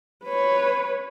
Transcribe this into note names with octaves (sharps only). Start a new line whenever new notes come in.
B4 C#5